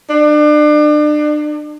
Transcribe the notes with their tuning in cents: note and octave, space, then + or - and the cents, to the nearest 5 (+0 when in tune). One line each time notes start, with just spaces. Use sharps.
D4 +35